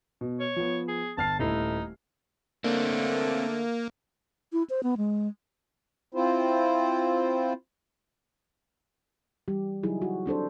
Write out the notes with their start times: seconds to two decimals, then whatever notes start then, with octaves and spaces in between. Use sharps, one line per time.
0.21 B2
0.40 C#5
0.56 F3 B3
0.88 G#4
1.17 G1 A5 F6 C7
1.39 D#1 A3 D#4 E4
2.64 D3 A3 A#3 C4 D4
4.53 E4
4.70 C5
4.83 B3
4.97 G#3
6.14 C4 E4 F4 C5
9.48 E3 G3 G4
9.83 C#3 F#3 D#4 E4 G#4
10.02 F#4
10.26 C4 D4 A4 C5